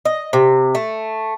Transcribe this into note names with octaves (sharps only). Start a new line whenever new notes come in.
D#5
C3
A3